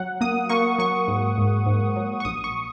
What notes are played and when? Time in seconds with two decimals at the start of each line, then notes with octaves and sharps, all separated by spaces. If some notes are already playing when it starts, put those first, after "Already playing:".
Already playing: F#3 F#5
0.21 A#3 D#6
0.49 A#3 C#6
0.79 F#3 C#6
1.08 G#2
1.38 G#2
1.66 G#2
1.96 F#3
2.20 C#6
2.25 A#1 D#6
2.44 C#6